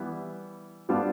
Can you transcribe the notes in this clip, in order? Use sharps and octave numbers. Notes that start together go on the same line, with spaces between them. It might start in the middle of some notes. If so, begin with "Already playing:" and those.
Already playing: E3 G3 B3 E4
G3 B3 D4 F4